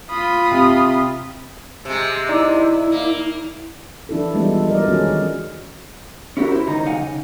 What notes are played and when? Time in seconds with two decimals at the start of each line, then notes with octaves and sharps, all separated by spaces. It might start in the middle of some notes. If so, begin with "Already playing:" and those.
0.10 F4 B5 D#6
0.51 C3
1.85 C3 G#3
2.29 D#4 E4 D5
2.92 A#3
4.09 E3 D4 E4 A4
4.34 G3 G#3 B3 D4 F4 A4
4.69 F#3 A#4 D5 D#5
4.88 D#3 G#3 C#4 F#4 G#4
6.37 C#4 E4 F#4 G4 A4 A#4
6.52 E4 C5
6.67 C#2 D#3 D#4 A#5
6.85 B1 C3 D#4 F5 F#5 G#5
6.99 C#3